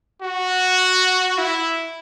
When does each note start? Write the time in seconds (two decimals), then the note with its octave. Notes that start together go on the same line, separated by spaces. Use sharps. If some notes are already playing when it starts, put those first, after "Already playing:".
0.22 F#4
1.38 E4